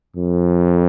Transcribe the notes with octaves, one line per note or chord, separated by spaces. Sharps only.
F2